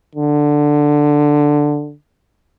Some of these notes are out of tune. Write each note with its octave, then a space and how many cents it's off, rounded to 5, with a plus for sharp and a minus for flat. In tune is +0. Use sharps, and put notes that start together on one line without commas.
D3 +5